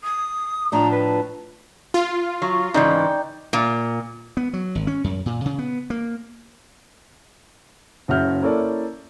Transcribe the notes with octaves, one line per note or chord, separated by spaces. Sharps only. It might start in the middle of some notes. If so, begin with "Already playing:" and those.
D#6
A2 F3 D4 A#5
B4
F4
F#3
G#2 C#3 E3 D#4 D5 G5
A#2
B3
F#3
G#1
C#4
F#2
A#2
C#3
B3
A#3
F#1 C#3 F#4 E5 F6 G6
A#3 C#4 E4 A4 D5